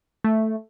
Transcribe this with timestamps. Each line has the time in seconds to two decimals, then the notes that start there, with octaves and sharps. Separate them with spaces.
0.24 A3